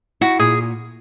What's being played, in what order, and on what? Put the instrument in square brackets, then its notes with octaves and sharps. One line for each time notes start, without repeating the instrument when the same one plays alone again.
[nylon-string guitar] E4 [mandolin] F#4
[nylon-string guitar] A#2 [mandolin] G#4